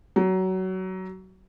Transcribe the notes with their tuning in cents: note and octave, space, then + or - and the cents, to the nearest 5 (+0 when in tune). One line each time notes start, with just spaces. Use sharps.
F#3 +20